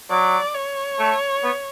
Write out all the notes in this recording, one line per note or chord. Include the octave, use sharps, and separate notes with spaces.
F#3 D5
C#5
A3
B3